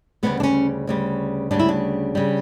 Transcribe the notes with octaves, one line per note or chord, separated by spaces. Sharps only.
D2 C#3 G3 B3
D4
C#4
D2 C#3 G3
D2 C#3 G3 D4
E4
D4
C#3 G3